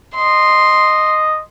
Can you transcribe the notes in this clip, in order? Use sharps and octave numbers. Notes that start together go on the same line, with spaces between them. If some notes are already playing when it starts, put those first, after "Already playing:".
D#5 C6